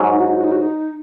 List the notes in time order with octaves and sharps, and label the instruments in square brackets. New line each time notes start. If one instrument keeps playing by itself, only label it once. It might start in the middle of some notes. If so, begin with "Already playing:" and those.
Already playing: [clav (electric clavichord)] G#2 F#3 C#4
[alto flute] D#4
F#4
D#4
F#4
D#4
F#4
D#4